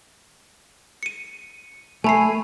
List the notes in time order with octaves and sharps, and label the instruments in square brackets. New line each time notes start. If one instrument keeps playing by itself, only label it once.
[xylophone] C#7 D#7
[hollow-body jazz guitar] A3 [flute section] G#5 [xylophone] A5 B5 C7